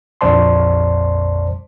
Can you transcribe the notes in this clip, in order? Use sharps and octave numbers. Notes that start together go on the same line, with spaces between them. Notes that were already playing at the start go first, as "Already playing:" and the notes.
A#1 F2 C5 D5 A5 C6